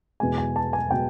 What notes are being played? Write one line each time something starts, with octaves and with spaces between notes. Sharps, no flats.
E2 B2 G#3 G#5
G#5
A5
G#5
B2 G#3 G5